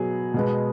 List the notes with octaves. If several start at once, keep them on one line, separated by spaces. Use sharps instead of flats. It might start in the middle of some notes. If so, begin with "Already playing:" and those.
Already playing: B2 F#3 B3 G#4
B2 G#3 B3